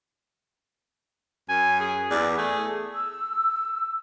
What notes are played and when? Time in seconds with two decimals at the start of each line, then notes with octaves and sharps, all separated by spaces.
1.49 F#2 G#5
1.80 G#4
2.11 E2 D5
2.38 A3 G#4
2.93 E6